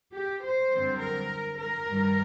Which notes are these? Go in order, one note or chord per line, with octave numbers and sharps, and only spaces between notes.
G4
C5
F#2 D3 G3 C4
A#4
A#4
G2 D#3 G3